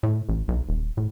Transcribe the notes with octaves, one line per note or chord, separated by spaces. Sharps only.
A2
A1
B1
D#1
A2